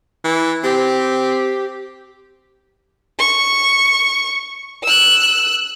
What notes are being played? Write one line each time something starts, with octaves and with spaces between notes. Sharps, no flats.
E3
C4 G4
C#6
E6 F#6